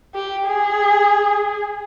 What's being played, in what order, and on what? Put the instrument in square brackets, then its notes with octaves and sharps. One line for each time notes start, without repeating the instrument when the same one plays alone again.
[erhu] G4
G#4